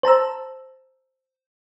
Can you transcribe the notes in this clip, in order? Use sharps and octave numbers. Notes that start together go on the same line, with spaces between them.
C5 A5 A#5 E6